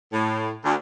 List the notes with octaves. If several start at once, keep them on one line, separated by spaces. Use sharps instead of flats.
A2
D2